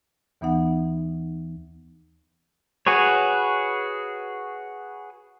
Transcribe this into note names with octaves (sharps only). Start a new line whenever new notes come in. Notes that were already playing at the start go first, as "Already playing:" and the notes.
D#2 E3 B3 D#4 F#5
F#4 G#4 B4 C#5